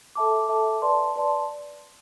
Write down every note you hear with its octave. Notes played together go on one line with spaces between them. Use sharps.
A4 E5 A5 D6
A4 E5 A5 D6
B4 D5 A5 C6
B4 D5 A5 C6